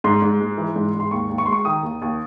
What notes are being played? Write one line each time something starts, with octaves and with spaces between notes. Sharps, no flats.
G#2 C6
G#2
G#3
E3
G#2
G#2
C6
D#2 C#6
D#2
C#6
G#3 C6
C#6
D#3 D#6
D#2
D#2